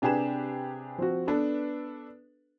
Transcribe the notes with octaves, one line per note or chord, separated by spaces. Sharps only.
C3 D4 G4 G#4 B4 E7
F3 C4 F#4
B3 D4 A4 B4